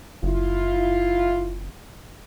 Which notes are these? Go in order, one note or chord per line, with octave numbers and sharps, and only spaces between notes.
F#1 E4 F4